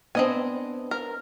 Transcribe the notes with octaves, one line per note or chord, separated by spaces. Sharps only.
B3 C4 D4 D#5 G#5
A#4